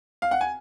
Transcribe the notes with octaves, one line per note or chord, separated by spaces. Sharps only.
F5
F#5
G#5